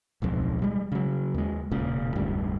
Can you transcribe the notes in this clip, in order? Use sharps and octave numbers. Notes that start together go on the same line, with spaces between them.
D1 B1 F2 G#2
G3 G#3
C#3 F#3
D#2 G#3
E1 A#2 C#3
F1 D2 G#2 G3